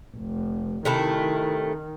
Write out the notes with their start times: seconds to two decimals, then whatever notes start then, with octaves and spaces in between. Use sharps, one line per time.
0.16 F1
0.85 C3 D#3 A3 E4